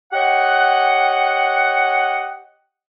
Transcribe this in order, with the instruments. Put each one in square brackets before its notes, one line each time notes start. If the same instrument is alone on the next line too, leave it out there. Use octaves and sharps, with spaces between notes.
[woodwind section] G4 C#5 D#5 F#5